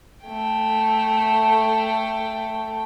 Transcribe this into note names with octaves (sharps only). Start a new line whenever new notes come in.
A3 G5